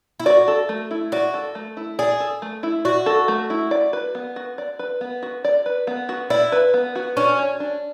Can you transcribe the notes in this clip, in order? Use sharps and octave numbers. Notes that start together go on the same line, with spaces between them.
E4
F#4 D5
A4
A3
E4
F#4 D5
A4
A3
E4
G#4 D5
A4
A3
E4
F#4 D5
A4
A3
E4
D5
B4
B3
F#4
D5
B4
B3
F#4
D5
B4
B3
F#4
E4 D5
B4
B3
F#4
C#4 D4
C#5
D4